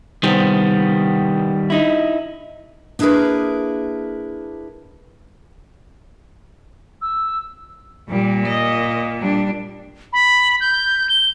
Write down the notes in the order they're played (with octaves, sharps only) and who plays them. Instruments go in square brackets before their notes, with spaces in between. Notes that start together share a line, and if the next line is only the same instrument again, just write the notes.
[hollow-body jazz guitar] C2 B3 C5 [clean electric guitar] D#3 G3
[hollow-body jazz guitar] D#4 E4
[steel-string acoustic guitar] A#3 D4 E4 G#4 A#4 B4
[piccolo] E6
[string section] A#2 [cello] G3
[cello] D#5
G3 D4
[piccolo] B5
G6
G7